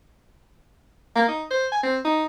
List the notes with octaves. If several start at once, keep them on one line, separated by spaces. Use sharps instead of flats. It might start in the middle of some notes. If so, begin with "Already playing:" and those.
A#3
D#4
C5
G#5
C4
D#4